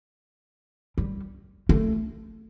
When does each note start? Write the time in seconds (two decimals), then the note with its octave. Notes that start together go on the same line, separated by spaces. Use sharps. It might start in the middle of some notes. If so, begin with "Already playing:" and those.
0.98 G3
1.69 A3